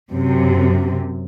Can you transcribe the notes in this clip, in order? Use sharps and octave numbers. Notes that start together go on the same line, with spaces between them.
F#2 C3